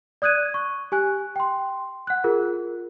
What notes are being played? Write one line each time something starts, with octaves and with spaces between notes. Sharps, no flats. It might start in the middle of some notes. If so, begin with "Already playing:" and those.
D5 D#6 F#6 G#6 D#7
C#6
G4 G#5 F#6
G5 C6
F#5 F#6
F4 G#4 A#4